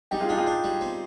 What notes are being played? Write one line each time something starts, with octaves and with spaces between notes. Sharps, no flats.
G3 D#4 G4
F4 G#4
D4 D#4 G4
F4 G#4
D4
G3
C4